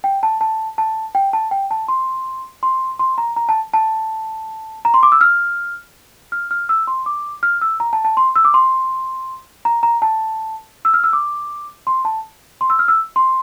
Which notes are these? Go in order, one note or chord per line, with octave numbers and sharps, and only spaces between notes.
G5
A5
A5
A5
G5
A5
G5
A5
C6
C6
C6
A#5
A#5
A5
A5
A#5
C6
D6
E6
F6
F6
F6
E6
C6
D6
F6
E6
A#5
A5
A5
C6
E6
D6
C6
A#5
A#5
A5
E6
F6
E6
D6
C6
A5
C6
E6
F6
E6
C6